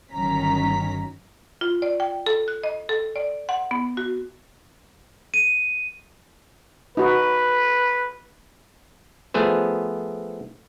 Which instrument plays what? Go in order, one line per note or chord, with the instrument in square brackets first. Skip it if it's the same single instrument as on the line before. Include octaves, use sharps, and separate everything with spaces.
[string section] G1 D#3 F#3 C#4 A#5 B6
[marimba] F4
D5
G5
A4
F#6
D#5
A4
D5
F#5
B3
F#4
[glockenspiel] D#7
[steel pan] D#4 F#4 [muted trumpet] B4
[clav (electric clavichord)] F3 A3 B3 G#4 C5